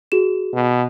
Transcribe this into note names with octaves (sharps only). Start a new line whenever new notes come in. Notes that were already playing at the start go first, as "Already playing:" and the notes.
F#4 G#4 E7
B2